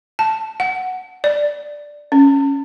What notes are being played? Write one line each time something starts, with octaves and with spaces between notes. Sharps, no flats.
A5
F#5
D5
C#4